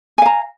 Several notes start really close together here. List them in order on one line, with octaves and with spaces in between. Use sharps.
G#5 F5 A#5